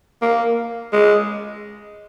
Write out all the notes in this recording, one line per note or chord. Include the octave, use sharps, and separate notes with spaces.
A#3
G#3